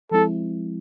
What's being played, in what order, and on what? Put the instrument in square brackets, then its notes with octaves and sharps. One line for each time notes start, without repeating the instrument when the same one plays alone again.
[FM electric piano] F3 G#3 C4 E4 [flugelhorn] A4